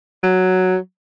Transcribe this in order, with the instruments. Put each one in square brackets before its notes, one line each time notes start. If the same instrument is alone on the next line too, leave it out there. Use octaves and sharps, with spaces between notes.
[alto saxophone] F#3